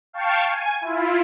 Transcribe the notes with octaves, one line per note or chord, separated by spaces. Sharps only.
F5 G5 A5 C#6
G#5
E4 F4